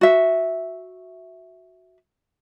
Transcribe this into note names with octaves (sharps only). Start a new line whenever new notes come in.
F#4 E5